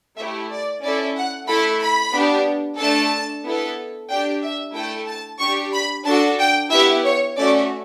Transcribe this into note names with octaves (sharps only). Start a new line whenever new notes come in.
A3 E4 G4 E5
D5
C#4 E4 A4 D5
F#5
A3 E4 A4 B5
B5
B3 D4 G4
A3 D4 A4 A5
B3 E4 A4
D4 G4 G5
E5
A3 E4 A4 G5
A5
D4 G4 C#6
B5
D4 F#4 A4 A5
G5
B3 E4 G4 E5
C#5
A3 C#4 F#4 A4 D5